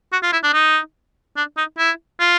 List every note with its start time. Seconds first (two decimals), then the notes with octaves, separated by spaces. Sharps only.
0.13 F#4
0.23 F4
0.33 E4
0.43 D4
0.53 D#4
1.37 D4
1.57 D#4
1.78 E4
2.20 F4